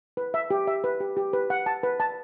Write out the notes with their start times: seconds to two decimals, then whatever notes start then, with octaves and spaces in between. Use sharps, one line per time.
0.17 B4
0.34 E5
0.50 G4
0.67 E5
0.84 B4
1.00 G4
1.17 G4
1.33 B4
1.50 F#5
1.66 A5
1.83 B4
2.00 A5